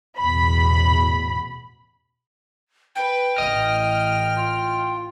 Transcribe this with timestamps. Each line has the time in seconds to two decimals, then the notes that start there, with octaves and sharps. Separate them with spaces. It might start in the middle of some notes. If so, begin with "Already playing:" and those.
0.19 A1 E2 B2 B5
2.95 B4 G5
3.38 A1 D#5 F6
4.37 F4